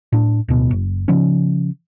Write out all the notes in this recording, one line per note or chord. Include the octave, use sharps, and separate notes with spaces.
A2 D4
D1 B2
F#1
C#3 F3 C#4